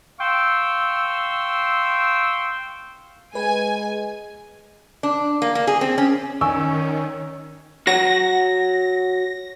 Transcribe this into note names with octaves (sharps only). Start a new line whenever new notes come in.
F5 G5 C6 C#6 E6
G#3 B4 G#5
D4
A#3
A#3
G#4
C4
C#4
D#3 C#4 D5 G#5 C#6 E6
F#4 C#5 F#5 A#6